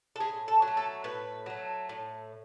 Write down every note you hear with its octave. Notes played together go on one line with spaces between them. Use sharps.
A4
A2 G#4
A4
F#3
A3
A4
A2 B4
F#3 A3
A2